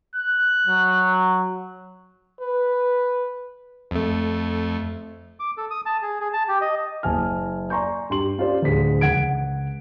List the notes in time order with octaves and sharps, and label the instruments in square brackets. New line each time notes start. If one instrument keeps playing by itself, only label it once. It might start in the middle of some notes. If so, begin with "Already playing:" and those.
[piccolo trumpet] F#6
[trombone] F#3
[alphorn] B4
[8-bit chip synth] F2 A3
[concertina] D6
A4
D#6
A5
G#4
G#4
A5
G4
D#5
[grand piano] F#1 G#5 A5 F6
D5 G#5 A#5 C6 C#6 G6
G2 G4 C6 F#7
C#4 F4 G4 C5 D5
D2 A2 G#4 B6
C#2 F#5 G#6 D7